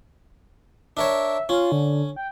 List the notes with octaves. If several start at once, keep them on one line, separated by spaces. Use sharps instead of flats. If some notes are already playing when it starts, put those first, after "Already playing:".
D4 A#4 C#5 E5
C#4 F4
D3
G5